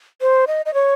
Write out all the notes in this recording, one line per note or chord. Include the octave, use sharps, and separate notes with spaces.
C5
D#5
D#5
C#5